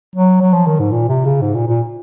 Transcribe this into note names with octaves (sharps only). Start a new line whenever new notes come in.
F#3
F#3
F3
D#3
G#2
A#2
C3
C#3
G#2
A#2
A#2